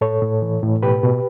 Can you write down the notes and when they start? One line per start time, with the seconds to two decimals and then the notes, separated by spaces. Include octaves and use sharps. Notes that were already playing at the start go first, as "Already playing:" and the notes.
0.01 A2 A4 C#5
0.22 A2
0.42 E3
0.62 A2
0.83 B2 G4 B4
1.03 B2